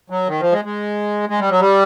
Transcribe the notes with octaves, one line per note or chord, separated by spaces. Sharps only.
F#3
D#3
F3
G#3
G#3
G#3
G3
F#3
G3